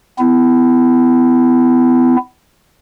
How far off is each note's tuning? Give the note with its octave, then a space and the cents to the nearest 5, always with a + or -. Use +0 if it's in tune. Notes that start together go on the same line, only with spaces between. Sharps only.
B3 +40 E4 +15